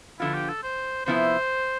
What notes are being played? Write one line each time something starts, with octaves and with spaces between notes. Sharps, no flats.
D3 F3 B3 E4 F4
G4
A4
C5
C3 F3 B3 E4 C5